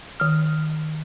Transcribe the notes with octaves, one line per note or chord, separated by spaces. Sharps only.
D#3 F6